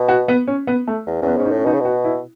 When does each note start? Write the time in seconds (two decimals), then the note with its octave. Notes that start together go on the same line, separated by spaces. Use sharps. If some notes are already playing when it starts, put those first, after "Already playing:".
Already playing: B2
0.08 F#4
0.28 B3
0.48 C#4
0.67 B3
0.88 A3
1.06 E2
1.22 E2 B3 C#4
1.37 G#2 C#4
1.46 D#4
1.51 A2
1.57 C#4
1.65 B2 D#4
1.73 C#3
1.80 B2 F#4
2.05 E4